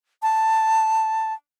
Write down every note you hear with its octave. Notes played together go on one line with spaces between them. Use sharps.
A5